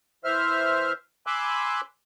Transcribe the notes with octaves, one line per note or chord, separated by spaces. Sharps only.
E3 C5 E5 F6
G#5 B5 C6 D6 E6 F#6